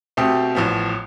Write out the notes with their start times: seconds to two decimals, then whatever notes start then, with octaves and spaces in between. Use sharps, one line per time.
0.17 B2 A3 C4 G4
0.55 A1 A2 F3 B3